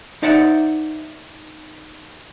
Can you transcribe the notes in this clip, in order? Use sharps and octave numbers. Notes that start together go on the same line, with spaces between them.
D#4 C5 D5 E5 F#5